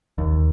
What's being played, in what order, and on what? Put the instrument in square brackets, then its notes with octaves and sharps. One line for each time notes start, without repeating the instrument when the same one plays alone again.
[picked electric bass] D#2